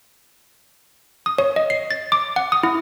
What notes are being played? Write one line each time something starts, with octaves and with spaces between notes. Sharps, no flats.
D#6
C#5
D#5
C7
A6
D6
F#5
D#6
E4